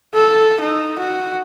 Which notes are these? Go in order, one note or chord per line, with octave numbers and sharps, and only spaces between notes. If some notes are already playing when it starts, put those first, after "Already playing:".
A4
D#4
F#4